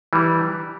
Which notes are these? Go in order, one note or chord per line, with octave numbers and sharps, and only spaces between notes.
E3 G3